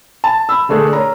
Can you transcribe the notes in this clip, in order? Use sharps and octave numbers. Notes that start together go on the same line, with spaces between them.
A5
B5 E6
D3 A3 D4 G#4
A#4 C#5 A#5